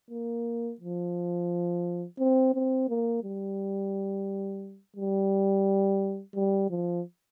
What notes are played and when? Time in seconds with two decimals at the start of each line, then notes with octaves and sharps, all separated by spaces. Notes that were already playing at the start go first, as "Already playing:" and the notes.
0.10 A#3
0.80 F3
2.19 C4
2.54 C4
2.89 A#3
3.23 G3
4.97 G3
6.36 G3
6.70 F3